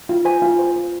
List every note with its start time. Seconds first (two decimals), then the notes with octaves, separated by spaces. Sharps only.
0.09 F4
0.25 C5 G#5
0.42 F4
0.59 C5
0.76 C5